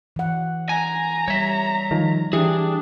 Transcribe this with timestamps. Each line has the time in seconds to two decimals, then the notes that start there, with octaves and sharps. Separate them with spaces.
0.16 E3 F#5
0.69 G#5 A#5
1.28 G3 C#5 E5
1.91 D#3 F3
2.33 E3 D4 G4 G#4